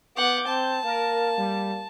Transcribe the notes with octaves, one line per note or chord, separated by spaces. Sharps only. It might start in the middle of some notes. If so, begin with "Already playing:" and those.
B3 F#5 D6 G6
C4 A5
A#3 A#4
G3